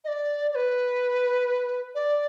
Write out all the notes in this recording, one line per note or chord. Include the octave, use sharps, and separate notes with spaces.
D#5
D5
D5
B4
D5